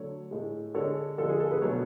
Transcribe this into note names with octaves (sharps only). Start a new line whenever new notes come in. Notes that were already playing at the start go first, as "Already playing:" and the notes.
Already playing: D3 F#3 A3 A4 C#5
A2 G#3
D3 G#3 A4 C#5
D3 F3 G#3 A4
G#4
A4
G#4 B4
B2 F#3 A3 A4 C#5